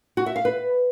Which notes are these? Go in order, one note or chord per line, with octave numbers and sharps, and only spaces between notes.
F#4
E5
F5
B4